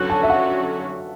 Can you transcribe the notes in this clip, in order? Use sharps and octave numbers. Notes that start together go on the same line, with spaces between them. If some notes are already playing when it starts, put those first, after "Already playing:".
Already playing: D3 F#3 C#4 F#4 F#6
A5
E5
F#5